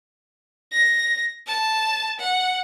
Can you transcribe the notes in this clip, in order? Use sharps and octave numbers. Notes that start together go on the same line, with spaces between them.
A#6
A5
F#5